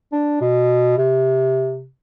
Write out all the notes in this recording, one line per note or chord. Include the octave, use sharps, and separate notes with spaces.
D4
B2
C3